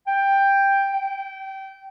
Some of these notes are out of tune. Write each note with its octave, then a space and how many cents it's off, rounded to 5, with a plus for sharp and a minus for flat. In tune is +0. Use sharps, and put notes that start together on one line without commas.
G5 +10
G5 -20